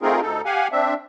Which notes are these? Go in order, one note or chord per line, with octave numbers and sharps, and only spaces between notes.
A3 C4 D#4 F4 G#4 A#4
D2 D#4 A4
G4 F5 F#5 G#5
C4 D4 E5